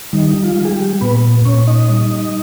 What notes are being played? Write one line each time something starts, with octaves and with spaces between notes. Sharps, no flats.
D#3 G3 D#4
F3 F4
G3
G#4
G3 G4
A#2 B3 B4
A#2 C#4 C#5
D#4 D#5
G3